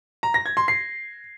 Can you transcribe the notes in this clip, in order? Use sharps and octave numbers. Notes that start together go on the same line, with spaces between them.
A#5
A#6
G#6
C6
C7